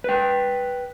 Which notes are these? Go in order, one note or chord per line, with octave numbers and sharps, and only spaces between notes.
B4 G5